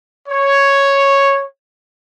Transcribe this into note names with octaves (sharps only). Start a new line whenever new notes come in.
C#5